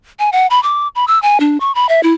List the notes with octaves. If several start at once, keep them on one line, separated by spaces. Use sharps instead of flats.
G#5
F#5
B5
D6
B5
E6
G#5
D4
C#6
B5
E5
E4